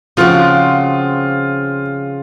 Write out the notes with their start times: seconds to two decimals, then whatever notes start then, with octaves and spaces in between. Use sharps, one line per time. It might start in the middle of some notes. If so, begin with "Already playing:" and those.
0.17 C#3 F3 C4 F4 F#4